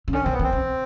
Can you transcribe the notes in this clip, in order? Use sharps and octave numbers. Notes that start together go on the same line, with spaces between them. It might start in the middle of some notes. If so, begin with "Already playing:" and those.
C#3
D3 C#4
D#3 C4
B3
D#3
C4
C#3